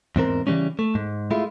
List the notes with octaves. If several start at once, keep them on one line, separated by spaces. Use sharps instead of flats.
E2 G#2 C4 A#4
C#3 E3 G3 G#3 C#4
A3
G#2
G#3 A3 E4 F4